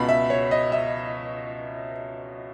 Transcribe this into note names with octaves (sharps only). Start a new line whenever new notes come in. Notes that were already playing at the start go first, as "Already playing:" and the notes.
Already playing: C#2 B2 B5
E5
C#5
D#5
E5